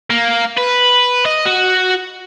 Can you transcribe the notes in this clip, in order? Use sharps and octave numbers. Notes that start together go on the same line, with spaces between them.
A#3
B4
D#5
F#4